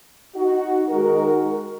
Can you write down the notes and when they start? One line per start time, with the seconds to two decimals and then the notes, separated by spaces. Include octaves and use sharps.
0.34 D#4 F#4
0.89 D#3 G#3 D#4 F#4 A#4